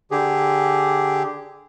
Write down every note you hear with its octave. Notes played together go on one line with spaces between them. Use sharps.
D3 G4 G#4